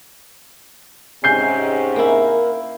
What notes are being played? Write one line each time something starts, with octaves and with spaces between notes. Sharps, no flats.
G#2 C3 C#4 G#5 G6 C7
A#3 E4 A#4